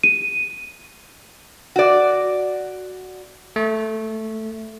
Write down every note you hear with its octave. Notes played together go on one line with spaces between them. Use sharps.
D#7
F#4 D5
A3